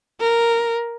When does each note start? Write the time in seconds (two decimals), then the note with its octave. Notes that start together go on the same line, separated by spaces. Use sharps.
0.21 A#4